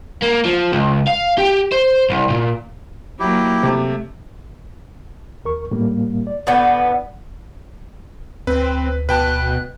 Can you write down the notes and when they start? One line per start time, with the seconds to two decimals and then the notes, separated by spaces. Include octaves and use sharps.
0.23 A#3
0.45 F3
0.72 C#2
1.07 F5
1.38 G4
1.72 C5
2.10 C2
2.30 A#2
3.20 F#3 A#3 E4 G4
3.63 C3 A3
5.45 D#2 A#4 C#6
5.71 A2 G3 A#3
6.27 D5
6.47 A2 D3 B3 D5
8.47 D2 C4 B4
9.09 B2 B4 G5 A5 F#6